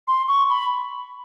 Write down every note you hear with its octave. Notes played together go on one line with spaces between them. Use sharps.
C6
C#6
B5